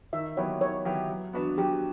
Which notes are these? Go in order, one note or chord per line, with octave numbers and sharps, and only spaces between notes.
D#3 E5
F#3 B3 E4 G4 C#5
D#3 C#5
F#3 B3 E4 G4
F#3
B3 D4 F#4 B4
F#3 G4